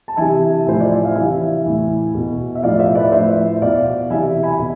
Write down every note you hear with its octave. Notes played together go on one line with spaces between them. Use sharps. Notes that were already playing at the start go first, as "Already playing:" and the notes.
A5
C3 E3 E5 G#5
A2 F3 C5
D5
E5
F5
C3 E3 E5 G#5
A2 E3
B2
E5
A2 F3 D5 F5
C5 E5
B4 D5
A2 F3 C5 E5
B2 D5 F5
C3 E3 E5 G#5
G#5 B5
B2